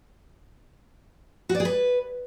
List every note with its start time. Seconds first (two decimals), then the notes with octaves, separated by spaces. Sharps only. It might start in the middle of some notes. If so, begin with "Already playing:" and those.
1.49 F#4
1.55 D5
1.60 G#4
1.65 B4